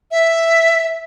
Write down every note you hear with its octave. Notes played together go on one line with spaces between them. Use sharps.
E5